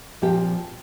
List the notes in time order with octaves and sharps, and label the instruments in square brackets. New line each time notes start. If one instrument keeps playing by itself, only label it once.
[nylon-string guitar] A#2 F3 C4 G4 G5